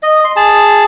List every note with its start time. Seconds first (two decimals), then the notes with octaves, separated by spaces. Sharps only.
0.03 D#5
0.24 C6
0.36 G#4 A5